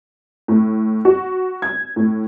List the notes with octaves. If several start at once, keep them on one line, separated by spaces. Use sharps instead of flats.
A2
F#4
G#6
A2